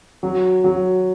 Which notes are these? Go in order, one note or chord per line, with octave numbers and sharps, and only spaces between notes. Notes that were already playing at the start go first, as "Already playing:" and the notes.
F#3
F#3